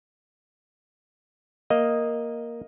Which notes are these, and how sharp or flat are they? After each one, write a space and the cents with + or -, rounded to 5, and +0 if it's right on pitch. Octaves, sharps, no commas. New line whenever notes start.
A#3 +0 D#5 +0